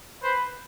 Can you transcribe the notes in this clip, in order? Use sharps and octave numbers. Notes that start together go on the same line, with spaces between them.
B4 C5